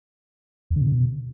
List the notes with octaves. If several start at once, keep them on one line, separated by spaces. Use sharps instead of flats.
E2
D3
B2
C#3
B2